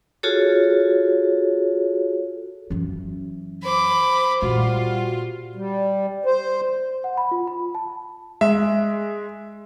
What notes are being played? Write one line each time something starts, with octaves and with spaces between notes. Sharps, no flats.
F4 F#4 G#4 A4 C#5
F#2 E3
C5 B5 D6
A#2 G3 F4 F#4
G3
C5
F#5
B5
F4
B5
A5
G#3 E5